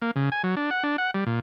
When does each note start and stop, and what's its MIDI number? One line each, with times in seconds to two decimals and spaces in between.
0.02 0.11 58
0.16 0.30 49
0.32 0.42 80
0.44 0.55 54
0.57 0.70 62
0.71 0.83 78
0.83 0.97 62
0.98 1.11 78
1.14 1.24 55
1.27 1.40 46